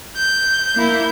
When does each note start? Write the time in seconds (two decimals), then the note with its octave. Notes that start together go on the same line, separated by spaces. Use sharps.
0.16 G6
0.75 A#3 E4